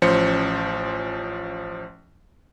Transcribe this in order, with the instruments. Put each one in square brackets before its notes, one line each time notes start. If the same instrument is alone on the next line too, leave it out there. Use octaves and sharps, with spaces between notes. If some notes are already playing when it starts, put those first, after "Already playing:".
[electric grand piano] A1 F3 C#4 C5 C#7